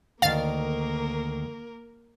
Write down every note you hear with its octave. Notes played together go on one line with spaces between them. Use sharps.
D2 D#3 A#3 A#4 F5 A6